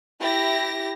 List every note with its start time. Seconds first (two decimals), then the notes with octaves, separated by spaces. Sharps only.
0.20 E4 G4 A#6